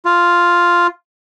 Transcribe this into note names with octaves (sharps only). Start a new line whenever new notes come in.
F4